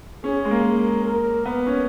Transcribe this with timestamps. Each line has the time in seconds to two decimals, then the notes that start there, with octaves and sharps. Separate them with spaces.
0.24 C#4 G#4
0.45 G#3
0.51 A#3
0.65 A#4
1.05 A#4
1.45 B3 B4
1.66 C#4